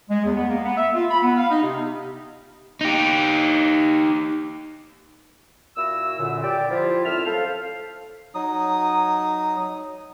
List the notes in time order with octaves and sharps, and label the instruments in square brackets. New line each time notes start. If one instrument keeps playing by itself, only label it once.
[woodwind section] G#3
E2
B3
A#3
B3
E5
F4
B5
B3
F5
D#4
C3
[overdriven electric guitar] D#4 G4
[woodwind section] A#2 E4 F#4 E6
F#2 A#2 D3
G4 D5
F3 E4 F4
F#2 A2 C4 E5 F6
A4 C5 F5
[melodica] F#3 D#4 D#6